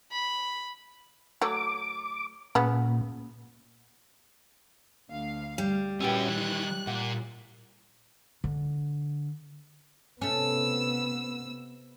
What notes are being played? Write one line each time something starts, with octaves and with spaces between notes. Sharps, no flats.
B5
F#3 A3 C#5 D6
A#2 C#3 B3
D2 F5
G3
A#2 B3 C#4 E4 F#4 G4 G5
D#3 E3 F#6
A#2 F#5
D3
C3 A3 B3 C#4 E6